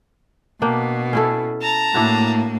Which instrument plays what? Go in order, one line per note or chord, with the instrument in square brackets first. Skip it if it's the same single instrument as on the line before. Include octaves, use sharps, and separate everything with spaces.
[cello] B2 [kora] A#3 D4 G5
[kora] C#4 E4 A4
[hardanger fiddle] A5 A#5
[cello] A2 A#3 [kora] D4 E4 F#4